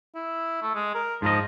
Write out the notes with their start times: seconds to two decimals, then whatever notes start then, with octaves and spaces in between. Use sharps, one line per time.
0.15 E4
0.62 A3
0.75 G#3
0.94 A#4
1.22 G#2 F3 D#5